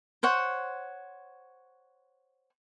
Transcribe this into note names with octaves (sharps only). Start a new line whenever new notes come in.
C5 C#5 F#5